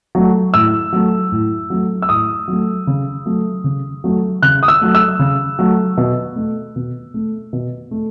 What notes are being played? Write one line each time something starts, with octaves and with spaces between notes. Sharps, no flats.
F#3 A3
A2 E6
F#3 A3
A2
F#3 A3
E6
A2 D#6
F#3
A3
C#3
F#3 A3
C#3
F#3 A3
C#3 F#6
D#6
E6
F#3 A3
E6
C#3
F#3 A3
B2
A3
B2
A3
B2
A3